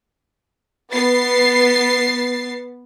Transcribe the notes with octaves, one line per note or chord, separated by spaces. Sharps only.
B3 A6 C7